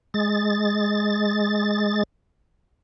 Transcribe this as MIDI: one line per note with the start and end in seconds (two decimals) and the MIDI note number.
0.14 2.03 56
0.14 2.03 93